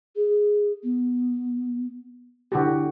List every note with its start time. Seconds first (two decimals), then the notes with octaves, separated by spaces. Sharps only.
0.16 G#4
0.83 B3
2.52 D3 E4 F#4 G4